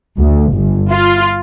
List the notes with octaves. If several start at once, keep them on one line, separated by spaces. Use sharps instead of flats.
D2
G1
F4